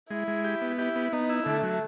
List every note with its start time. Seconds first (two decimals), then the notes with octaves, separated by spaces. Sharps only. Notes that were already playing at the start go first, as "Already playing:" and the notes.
0.10 G#3 E4
0.28 G#3
0.44 G4
0.62 B3
0.79 E4 G4
0.96 B3
1.12 B3 D#4
1.29 E4
1.46 D3 A3
1.63 F#3